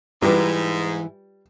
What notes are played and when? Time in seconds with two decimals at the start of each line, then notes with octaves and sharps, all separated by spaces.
0.22 G#2 E3 G3 E4 F4 B4 D6